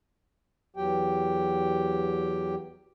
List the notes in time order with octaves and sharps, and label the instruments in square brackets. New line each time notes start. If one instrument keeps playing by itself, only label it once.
[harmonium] E2 F#3 G4 G5